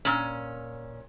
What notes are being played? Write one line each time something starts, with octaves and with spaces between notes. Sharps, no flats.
A#2 C#4